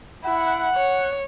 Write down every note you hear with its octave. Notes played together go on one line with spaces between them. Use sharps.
E4 F#5
C#5